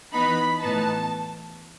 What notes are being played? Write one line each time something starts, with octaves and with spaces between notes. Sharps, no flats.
E3 B3 D#4 B5
A2 E3 B3 D#4 A5